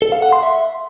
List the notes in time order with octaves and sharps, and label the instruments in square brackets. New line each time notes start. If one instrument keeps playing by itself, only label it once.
[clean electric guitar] A4
F5
F#5
C6
E5